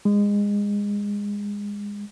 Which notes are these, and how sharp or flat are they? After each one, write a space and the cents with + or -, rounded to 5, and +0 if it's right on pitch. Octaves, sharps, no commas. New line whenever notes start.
G#3 -25